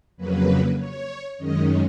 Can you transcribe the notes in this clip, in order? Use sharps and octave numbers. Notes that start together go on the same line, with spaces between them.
F2 C#3 F#3 A#3 B4
C#5
F#2 D#3 G#3 C#4 D#5